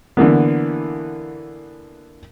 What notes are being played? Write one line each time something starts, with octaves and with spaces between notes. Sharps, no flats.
D3 E3 A#3 B3